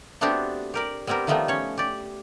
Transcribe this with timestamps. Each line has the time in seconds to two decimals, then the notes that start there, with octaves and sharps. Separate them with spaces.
0.21 A3 B3 C4 D4 F#4 G4
0.74 G4 A#4 D5
1.07 G3 B3 C4 G4 A#4
1.27 D#3 F3 G3 A3 B3 D#4
1.48 C#4 C#5
1.78 G4 D5